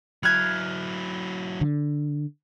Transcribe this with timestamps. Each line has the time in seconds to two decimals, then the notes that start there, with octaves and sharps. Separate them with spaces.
0.23 F#3 E4 F6 F#6 G#6
1.61 D3